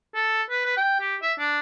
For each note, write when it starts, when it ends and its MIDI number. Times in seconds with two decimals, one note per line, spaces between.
0.14 0.42 69
0.50 0.62 71
0.65 0.76 71
0.77 0.99 79
1.00 1.16 67
1.22 1.33 76
1.39 1.60 62